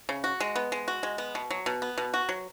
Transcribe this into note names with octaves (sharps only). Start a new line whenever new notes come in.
C#3
F#4
G#3
B3
G#3
F#4
G#3
B3
B2
F#3
B2
B3
B2
F#4
F#3